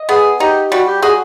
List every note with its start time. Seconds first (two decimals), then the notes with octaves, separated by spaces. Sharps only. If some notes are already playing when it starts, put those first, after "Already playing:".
Already playing: D#5
0.09 B3 G#4
0.40 D#4 G4
0.71 G3 F#4
0.87 G4
1.02 F#4 G#4